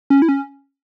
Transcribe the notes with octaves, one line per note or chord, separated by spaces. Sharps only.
C#4
E4
C#4